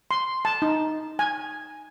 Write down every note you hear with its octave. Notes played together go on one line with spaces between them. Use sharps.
C6
A5
D#4
G#5